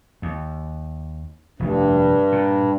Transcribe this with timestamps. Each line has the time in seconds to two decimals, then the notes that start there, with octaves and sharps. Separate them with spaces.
0.22 D#2
1.60 F1 D2 G2
2.32 A#2